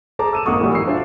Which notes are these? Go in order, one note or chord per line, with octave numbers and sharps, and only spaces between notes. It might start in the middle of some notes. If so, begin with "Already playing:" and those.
G#4 A4 C5 A5 A#5 D6
E6 D#7 E7
G#1 A#3 F#5 C#6 D#6
A#2 E3 F#3 G3
E6 C7
D4 F4 C5 E5